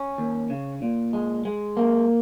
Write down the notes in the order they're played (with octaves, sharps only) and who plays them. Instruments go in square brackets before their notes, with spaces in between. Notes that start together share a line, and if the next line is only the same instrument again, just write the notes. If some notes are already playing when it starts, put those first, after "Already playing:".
Already playing: [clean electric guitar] C#4
D#2
C#3
A#2
G#3
G#3
A#3